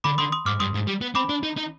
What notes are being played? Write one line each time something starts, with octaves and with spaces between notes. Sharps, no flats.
D3 B5 D6
D3 C6 D#6
C6 D#6
G#2 D6 F6
G2 C6 D#6
G#2
G3
B3
C4 B5 D6
D4
D#4
D#4